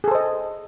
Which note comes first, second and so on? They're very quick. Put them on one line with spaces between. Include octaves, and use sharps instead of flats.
G#4 A4 C5 D#5